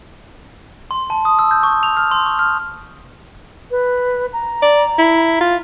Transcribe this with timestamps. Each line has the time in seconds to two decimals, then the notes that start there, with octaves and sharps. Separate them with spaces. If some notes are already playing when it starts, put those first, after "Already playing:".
0.91 C6
1.10 A5
1.25 D#6
1.39 E6
1.51 G6
1.63 C#6
1.83 F7
1.97 F6
2.11 C6
2.26 C#6
2.39 F6
3.71 B4
4.33 A#5
4.62 D5
4.99 E4
5.41 F4